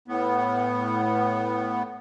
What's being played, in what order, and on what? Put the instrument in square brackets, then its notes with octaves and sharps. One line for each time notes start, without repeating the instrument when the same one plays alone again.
[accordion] A2 B3